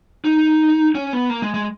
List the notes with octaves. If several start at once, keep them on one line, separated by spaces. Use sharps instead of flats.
D#4
C#4
B3
A#3
G#3
G#3